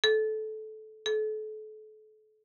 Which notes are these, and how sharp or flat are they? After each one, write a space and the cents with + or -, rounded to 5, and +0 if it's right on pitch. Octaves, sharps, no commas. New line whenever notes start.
A4 -20
A4 -35